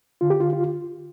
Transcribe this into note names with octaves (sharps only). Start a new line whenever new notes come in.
D3 F4
G4
F4
F4